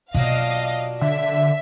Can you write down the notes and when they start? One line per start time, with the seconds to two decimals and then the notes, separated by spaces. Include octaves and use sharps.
0.14 B2 F#3 A#3 D4 F4 D#5 F5
1.01 D3 E5